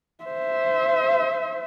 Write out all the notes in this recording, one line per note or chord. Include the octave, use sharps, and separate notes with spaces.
C5 E5